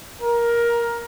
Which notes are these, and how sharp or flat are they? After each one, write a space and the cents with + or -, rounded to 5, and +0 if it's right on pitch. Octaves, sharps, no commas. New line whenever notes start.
A#4 +15